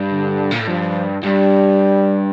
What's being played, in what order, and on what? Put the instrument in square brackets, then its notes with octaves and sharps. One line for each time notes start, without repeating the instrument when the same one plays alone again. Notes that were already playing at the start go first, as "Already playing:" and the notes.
Already playing: [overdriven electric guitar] G2
[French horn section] D3
[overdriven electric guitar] A#2
A2
[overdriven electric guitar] G2 [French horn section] F3
[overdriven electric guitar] G2 [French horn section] G3